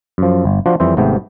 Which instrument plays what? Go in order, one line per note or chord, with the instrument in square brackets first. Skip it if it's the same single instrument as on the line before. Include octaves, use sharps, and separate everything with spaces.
[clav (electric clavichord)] F#2 F3
G1
F3 D4 F4 F#4
F2 E3 G3 C5 E5
G#1 G#2 C3 A3 B3 G5